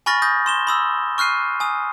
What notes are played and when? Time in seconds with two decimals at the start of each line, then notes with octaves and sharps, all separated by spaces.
0.06 G#5 B5 C#6 F6 A6 A#6
0.22 D#6 G6 A#6
0.46 C6 E7 G7
0.67 B5 D#6 E6
1.18 C#6 F6 F#6 C7 D#7
1.60 G#5 D#6